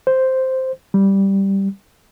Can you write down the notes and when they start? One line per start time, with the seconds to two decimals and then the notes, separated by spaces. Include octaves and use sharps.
0.07 C5
0.94 G3